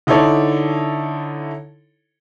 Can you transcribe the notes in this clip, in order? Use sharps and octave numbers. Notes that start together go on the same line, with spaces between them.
D3 D#4 E4 A4 C#5 D5